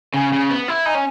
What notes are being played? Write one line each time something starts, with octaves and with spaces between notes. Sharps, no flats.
C#3 G#5
C#3
B3
E4
D#4 G#5
C#4